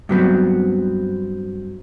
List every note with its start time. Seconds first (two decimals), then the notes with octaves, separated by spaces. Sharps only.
0.09 G2 F#3 B3 C4